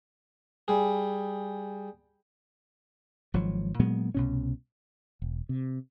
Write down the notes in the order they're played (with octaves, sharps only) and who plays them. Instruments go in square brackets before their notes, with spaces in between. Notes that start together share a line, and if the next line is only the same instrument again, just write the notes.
[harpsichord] G3 G#4
[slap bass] G#1 F3 F#3
A#2 F#3 G#3 B3
C2 B2 C#4
[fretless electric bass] E1
C3